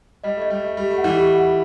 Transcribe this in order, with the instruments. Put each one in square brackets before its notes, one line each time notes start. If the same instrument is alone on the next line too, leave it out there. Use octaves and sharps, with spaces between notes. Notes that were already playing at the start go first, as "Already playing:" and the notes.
[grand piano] G3 [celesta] D#5
[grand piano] A3 [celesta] D#5
[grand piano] G3
[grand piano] A3 [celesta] D#5
[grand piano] G3 [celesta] G4
[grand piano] A3
[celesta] F#5
[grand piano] E3 G3
[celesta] G4
F#5